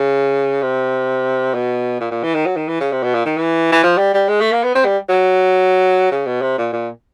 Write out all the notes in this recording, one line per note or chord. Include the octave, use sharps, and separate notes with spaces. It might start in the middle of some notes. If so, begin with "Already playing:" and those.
Already playing: C#3
C3
B2
A#2
A#2
E3
D#3
F#3
D#3
E3
C#3
C3
B2
A#2
D#3
E3
E3
F3
G3
G3
G#3
A3
A#3
B3
C4
G3
F#3
C#3
B2
C3
A#2
A#2